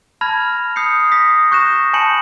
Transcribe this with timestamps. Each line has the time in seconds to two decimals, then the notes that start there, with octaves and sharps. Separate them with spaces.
0.21 A5 B5 F6 G#6 A#6 F7
0.76 D#6 G6 C7 C#7
1.12 D#6 A#6 B6
1.51 C#6 F#6 G6 A#6 B6 E7
1.93 G#5 A5 B5 G6 C#7 F#7